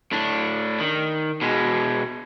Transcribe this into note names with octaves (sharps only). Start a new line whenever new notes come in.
A2 D4
D#3
B2 G#3